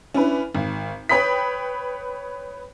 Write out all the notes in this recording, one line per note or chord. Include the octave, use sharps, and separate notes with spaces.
C#4 D4 E4 B4
G#1
B4 C#5 G5 B5 D#6 B6